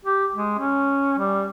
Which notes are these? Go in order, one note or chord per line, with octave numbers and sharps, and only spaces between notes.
G4
G#3
C#4
G3